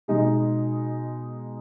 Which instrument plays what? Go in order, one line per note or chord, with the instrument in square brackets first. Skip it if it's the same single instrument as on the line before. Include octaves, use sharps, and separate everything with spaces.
[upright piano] B2 G#3 D#4 G#4